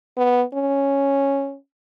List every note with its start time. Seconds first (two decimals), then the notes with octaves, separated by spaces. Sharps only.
0.17 B3
0.54 C#4